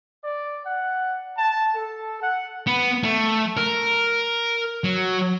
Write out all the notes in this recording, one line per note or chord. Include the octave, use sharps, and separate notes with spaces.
D5
F#5
A5
A4
F#5
B3
A3
A#4
F#3